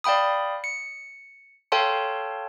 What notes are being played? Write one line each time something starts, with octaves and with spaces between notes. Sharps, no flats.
D5 F5 G5 B5 D#6
C#7
A4 C#5 F5 G5 A5 C6